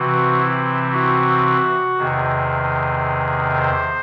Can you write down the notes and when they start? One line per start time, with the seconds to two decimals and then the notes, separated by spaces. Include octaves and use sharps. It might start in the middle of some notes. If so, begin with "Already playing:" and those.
Already playing: C3 E3 C4 F#4
0.38 E4
0.91 F#4
1.98 E2 C3 D#3 G#4
3.59 C5